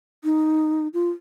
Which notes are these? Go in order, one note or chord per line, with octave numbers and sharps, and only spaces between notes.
D#4
F4